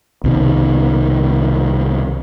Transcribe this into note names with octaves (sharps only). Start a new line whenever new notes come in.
C2 B2 D#3